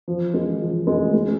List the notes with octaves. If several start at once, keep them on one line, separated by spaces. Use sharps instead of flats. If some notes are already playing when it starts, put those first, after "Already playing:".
F3
G#3
F3
G#3
A3
G#3